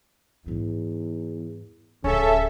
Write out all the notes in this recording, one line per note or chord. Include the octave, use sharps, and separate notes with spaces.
E2 G#2 G3
D1 D2 C#3 C#4 A4 E5